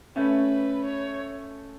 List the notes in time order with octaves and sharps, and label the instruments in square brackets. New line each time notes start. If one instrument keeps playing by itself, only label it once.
[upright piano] A3 C#4 [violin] B4
[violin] B4
C#5